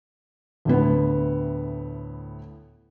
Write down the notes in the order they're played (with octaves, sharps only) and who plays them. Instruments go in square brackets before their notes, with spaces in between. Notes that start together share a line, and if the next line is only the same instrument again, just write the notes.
[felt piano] D2 A2 B3